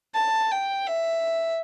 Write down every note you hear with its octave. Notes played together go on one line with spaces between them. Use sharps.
A5
G5
E5